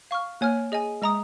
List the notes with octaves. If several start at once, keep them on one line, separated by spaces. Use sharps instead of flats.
F5 C#6 F6
A#3 C#5 G#5 F6
G#4 D#5 G#5
G#3 D#5 A#5 D#6